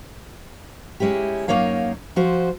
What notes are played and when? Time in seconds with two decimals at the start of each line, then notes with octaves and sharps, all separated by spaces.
1.00 G#3 C#4 E4 G4
1.48 F#2 A3 A#3 D#4 C#5 F5
2.16 F3 F#4 C5